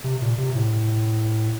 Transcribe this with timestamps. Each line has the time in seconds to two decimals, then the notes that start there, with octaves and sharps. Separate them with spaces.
0.04 C3
0.22 A#2
0.38 C3
0.55 A2